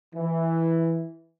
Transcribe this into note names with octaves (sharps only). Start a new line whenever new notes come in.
E3